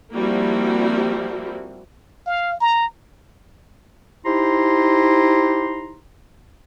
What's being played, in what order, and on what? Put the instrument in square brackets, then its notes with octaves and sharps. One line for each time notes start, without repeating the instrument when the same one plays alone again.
[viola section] F3 G3 A#3 C4 E4 F#4
[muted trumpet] F5
A#5
[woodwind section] D#4 E4 G4 C5 A#5 C6